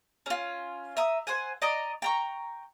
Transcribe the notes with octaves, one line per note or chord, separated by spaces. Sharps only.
C#4 F4
E5 A#5 D#6
C5 F#5 G#5
D5 D#5 A#5 D#6
G5 A#5 C#6